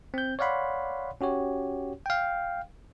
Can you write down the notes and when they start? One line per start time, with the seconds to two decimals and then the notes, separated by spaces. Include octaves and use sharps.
0.14 C4 G6
0.39 C#5 D5 F5 F#5 B5 C6
1.21 C#4 F#4 G4 C#5
2.06 F5 G5